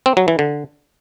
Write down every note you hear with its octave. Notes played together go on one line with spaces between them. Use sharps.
C4
F#3
E3
D3